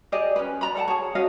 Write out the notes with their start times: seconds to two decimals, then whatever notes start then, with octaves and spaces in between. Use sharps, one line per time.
0.12 G4 G#4 D5 D#5
0.36 C#4 B4
0.61 D5 A#5 B5
0.75 A4 F#5 G5 A5
0.88 G#4 C#5
1.15 C#4 F#4 D#5 F5